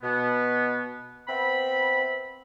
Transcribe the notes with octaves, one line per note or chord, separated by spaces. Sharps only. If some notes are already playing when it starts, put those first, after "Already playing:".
B2 B3
B3 C4 E5 B5